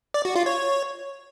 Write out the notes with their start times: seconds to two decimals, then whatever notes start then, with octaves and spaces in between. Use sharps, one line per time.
0.14 D5
0.25 F#4
0.36 F4
0.46 C#5